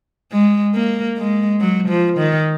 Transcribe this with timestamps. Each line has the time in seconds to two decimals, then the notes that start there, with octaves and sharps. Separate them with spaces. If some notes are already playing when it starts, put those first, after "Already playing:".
0.32 G#3
0.75 A#3
1.18 G#3
1.60 F#3
1.89 F3
2.18 D#3